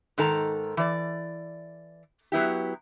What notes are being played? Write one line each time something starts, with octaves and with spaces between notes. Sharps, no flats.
G#2 D#3 A4 A#5
E3 D5
F#3 B3 E4 G4